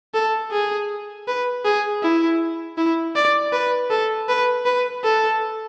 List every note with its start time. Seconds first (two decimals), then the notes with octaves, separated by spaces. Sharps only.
0.14 A4
0.51 G#4
1.28 B4
1.65 G#4
2.03 E4
2.77 E4
3.16 D5
3.53 B4
3.90 A4
4.29 B4
4.66 B4
5.04 A4